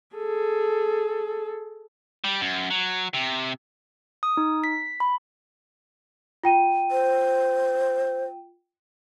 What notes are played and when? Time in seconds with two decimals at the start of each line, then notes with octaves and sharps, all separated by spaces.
0.16 G#4 A4
2.24 G3
2.41 F#2
2.70 F#3
3.14 C3
4.23 D#6
4.37 D#4
4.64 B6
5.00 B5
6.44 F4 G5 D#7
6.91 C5